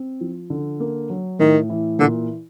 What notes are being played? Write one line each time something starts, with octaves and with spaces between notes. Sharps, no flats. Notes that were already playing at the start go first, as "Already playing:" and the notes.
Already playing: C4
F3
D3
A#3
F#3
A2 D#3
E3
A#2 D3